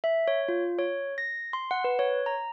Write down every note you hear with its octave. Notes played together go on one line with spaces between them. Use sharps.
E5
C#5
F4
C#5
A#6
C6
F#5
B4
C#5
A#5